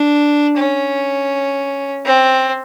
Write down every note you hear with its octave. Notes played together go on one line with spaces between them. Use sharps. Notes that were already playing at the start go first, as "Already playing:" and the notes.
Already playing: D4
C#4
C4